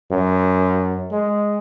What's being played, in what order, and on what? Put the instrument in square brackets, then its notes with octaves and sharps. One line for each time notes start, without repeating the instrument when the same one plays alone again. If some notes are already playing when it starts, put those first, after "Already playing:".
[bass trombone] F#2
G#3